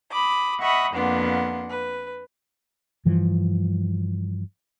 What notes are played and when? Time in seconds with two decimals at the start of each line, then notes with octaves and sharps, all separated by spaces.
0.12 B5 D6 D#6
0.61 D#5 E5 F#5 B5 C#6 D#6
0.92 F2 A#3 B3 D4 F#5 C6
1.70 B4
3.05 G2 E3 F3 G3